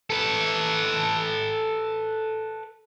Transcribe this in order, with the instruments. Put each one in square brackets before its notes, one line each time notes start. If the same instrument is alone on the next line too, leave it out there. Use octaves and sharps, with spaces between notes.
[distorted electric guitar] A4 B4